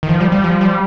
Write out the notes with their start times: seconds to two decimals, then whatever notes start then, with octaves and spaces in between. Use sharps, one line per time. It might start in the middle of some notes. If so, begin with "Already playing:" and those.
0.03 D#3
0.09 F3
0.20 G3
0.32 G3
0.44 F3
0.61 G3